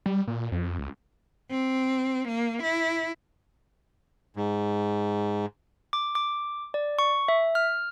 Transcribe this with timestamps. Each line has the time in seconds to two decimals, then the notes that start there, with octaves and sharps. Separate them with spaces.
0.06 G3
0.27 A#2
0.52 F2
0.79 C#2
1.50 C4
2.28 A#3
2.62 E4
4.36 G#2
5.93 D6
6.15 D6
6.74 D5
6.99 C#6
7.28 E5
7.55 F6